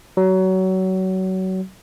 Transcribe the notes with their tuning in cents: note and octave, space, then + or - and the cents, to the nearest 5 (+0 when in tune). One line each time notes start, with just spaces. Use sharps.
F#3 +25